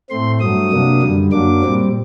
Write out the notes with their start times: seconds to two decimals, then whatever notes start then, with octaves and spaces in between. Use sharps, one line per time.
0.10 A2 A3 C4 C6
0.40 G2 F#3 A3 D#6
0.71 C3 F#3 A#3 D4
1.01 F#2 D3 G3
1.32 F#2 F#3 A#3 D4 D6
1.62 A#2 G3 C4